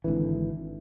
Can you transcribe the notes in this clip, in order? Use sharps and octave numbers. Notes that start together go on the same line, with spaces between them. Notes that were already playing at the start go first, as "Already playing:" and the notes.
G#1 D3 E3